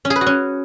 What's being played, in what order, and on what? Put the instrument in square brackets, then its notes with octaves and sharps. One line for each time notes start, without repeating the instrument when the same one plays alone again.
[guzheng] C#4
G#4
B4
F#4
C#4